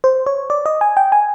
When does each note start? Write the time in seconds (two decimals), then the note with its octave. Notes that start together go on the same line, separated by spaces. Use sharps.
0.04 C5
0.26 C#5
0.50 D5
0.66 D#5
0.81 G#5
0.97 G5
1.12 G#5